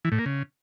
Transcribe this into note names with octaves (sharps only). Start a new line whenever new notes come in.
E3
A2
A#3
C#3